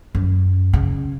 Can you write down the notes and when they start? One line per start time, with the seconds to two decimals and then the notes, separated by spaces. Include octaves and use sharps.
0.15 F#2
0.73 C#3